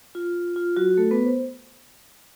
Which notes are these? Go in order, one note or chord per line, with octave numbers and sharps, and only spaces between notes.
F4
F4
F#3 F#4
A3 A4
B3 B4
C5